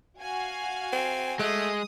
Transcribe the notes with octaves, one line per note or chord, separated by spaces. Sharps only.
F#4 F5 G#5
C4
G#3 A3 D#6